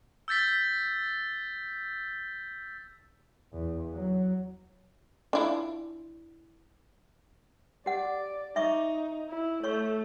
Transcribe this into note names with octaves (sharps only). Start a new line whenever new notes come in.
E6 G6 A6 B6
E2
F#3
D4 E4 F4
G4 D5 F#5
D#4 E5 C#6 D6
E4
A3 C#5 C#6